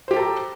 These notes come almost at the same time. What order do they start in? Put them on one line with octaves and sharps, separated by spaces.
C5 G4 G5 A4 A#5